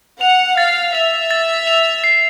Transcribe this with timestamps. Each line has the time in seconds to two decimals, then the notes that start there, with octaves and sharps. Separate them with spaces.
0.21 F#5 F7
0.57 F5 A6
0.95 E5 F7
1.31 A6
1.67 F7
2.04 C7